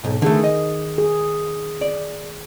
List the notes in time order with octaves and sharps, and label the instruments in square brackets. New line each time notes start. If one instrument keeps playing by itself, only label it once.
[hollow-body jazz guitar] B1 G#2
[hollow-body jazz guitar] D3 A3 [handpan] D#3 G#4
[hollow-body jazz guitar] D#5
[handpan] G#4
[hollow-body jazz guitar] D5